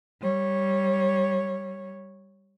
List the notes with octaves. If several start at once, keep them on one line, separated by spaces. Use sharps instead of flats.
G3 C#5